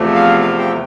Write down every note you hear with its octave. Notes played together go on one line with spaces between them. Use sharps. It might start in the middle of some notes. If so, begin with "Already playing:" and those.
Already playing: E2 C3 F3 A3
F5
F5
G5